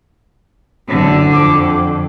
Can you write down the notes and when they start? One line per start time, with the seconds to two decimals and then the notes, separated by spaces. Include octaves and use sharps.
0.88 F#1 F#2 D3
1.32 F2 D6